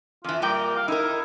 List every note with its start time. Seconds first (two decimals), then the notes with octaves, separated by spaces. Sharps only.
0.24 F2 E3 F4
0.42 A#2 G3 A#4 G5
0.77 F5
0.88 D#4 E4 A#4